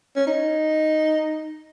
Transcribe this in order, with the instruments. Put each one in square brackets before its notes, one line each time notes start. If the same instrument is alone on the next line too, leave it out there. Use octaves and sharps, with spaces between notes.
[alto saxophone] C#4
D#4